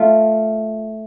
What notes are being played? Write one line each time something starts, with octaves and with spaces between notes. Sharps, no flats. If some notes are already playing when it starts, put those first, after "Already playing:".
Already playing: A3 F4